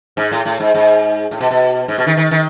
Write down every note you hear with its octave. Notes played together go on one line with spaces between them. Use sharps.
G#2
A2
A2
G#2
G#2
A2
B2
B2
G#2
B2
D#3
D#3
D#3